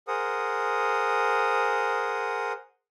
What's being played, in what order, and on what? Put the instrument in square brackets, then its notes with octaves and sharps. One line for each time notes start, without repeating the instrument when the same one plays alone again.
[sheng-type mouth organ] G#4 A#4 C5 F#5 D#6